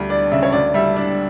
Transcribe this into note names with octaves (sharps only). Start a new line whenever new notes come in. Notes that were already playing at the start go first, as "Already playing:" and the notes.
Already playing: D2 G3
D4 D5
C#3 E5
C#5
D2 D5
G3 E5
D4